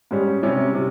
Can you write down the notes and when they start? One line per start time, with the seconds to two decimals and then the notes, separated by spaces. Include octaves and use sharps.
0.11 G#2 G3 C#4
0.43 C3 G3 C#4 E4
0.75 C3